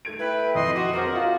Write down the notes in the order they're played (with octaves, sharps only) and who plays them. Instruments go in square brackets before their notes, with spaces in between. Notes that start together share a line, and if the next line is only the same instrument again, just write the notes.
[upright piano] A3 G#6 D7
[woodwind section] E4 G5 [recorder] B4
[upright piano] F2 [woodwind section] D#5 [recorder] C6
[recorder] F#4 [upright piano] D6
[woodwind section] C#2 D4 A#4 [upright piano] C4 C5 [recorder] F#4
[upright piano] F4